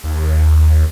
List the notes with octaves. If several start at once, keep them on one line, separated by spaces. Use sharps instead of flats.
D#2